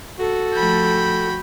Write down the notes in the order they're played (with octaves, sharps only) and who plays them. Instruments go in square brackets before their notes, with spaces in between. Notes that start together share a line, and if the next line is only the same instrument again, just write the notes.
[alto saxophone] F#4 [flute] A4
[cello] F3 A3 [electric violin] G5 B5